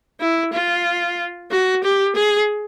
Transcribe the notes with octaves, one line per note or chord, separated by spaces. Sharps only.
E4
F4
F#4
G4
G#4